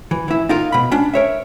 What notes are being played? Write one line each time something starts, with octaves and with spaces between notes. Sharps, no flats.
E3
E3 E4
D#4 F4 A#4
B2 B5
C#4 D4
A#4 C#5 E5